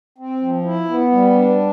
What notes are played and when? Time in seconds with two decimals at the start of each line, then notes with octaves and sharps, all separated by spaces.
0.18 C4
0.41 F3
0.64 E4
0.88 B3
1.11 G3
1.35 D4